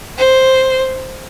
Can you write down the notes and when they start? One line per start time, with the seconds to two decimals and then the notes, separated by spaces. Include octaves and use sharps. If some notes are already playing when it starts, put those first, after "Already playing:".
0.18 C5